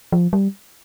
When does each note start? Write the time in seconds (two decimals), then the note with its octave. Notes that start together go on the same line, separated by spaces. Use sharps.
0.12 F3
0.33 G3